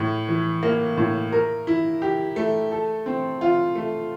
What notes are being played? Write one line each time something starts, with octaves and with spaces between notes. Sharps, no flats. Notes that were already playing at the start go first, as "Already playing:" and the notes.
Already playing: A2
E3
A#3
A2
A#4
E4
G4
A3
A4
C4
F4
A3